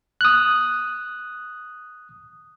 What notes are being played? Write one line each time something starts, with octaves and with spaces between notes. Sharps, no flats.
D#6 F#6